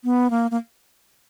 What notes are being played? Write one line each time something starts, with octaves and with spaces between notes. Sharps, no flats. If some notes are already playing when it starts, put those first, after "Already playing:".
B3
A#3
A#3